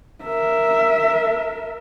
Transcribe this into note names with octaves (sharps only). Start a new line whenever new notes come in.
A#4 E5